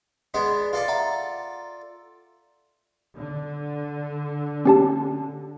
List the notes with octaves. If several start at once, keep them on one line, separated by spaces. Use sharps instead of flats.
G#3 B3 D4
F4 A4 D5
E5 F#5 A#5
D3
C#4 G4 A5